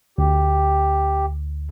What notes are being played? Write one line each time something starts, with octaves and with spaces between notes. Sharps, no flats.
D2 G4